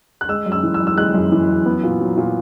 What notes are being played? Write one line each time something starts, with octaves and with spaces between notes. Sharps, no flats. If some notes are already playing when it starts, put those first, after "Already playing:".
F#6
G#3 E6
F#2
E6
E3
E6
F#2
E6
G#3 F#6
F#2
E3
F#2
B3
A#2
F#3
A#2